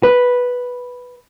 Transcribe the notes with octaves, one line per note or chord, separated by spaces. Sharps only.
B4